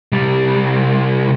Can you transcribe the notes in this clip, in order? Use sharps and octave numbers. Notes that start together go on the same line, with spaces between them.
C2 G3